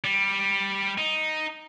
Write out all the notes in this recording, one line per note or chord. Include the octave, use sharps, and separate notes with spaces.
G3
D#4